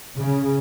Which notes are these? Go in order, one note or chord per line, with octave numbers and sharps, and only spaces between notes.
C#3